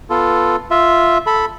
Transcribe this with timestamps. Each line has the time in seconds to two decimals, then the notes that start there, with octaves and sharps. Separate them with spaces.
0.10 B3 F4 A4
0.71 F4 E5
1.26 A4 B5